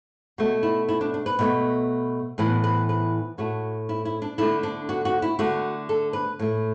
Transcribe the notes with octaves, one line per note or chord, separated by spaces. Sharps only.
B2 A3 F#4
E4
E4
D4
D4
B4
B2 A3
A2 E3 B3 B4
B4
B4
A2 A3 F#4
E4
E4
D4
D3 A3 E4
D4
F#4
F#4
E4
D3 A3 F#4
A4
B4
A2 A3